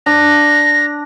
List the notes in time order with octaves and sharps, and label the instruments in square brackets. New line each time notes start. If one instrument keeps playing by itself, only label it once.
[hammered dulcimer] D4 [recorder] A#6